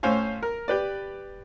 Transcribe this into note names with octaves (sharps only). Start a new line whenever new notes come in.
A2 C#4 C5 F5 G#5
A#4
G4 B4 D5